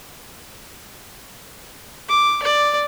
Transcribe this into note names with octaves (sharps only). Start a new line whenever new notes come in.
D6
D5